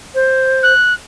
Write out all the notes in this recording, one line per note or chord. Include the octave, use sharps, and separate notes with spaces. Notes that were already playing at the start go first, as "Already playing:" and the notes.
C5
F#6